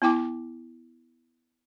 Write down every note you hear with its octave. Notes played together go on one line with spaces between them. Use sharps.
B3 E4 G5 D6